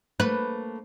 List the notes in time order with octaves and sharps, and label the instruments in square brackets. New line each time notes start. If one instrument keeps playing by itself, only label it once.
[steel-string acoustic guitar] A3 A#3 [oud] B4